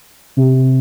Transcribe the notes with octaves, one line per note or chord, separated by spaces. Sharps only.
C3